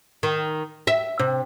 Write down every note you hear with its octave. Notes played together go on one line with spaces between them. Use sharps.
D#3
E5
C3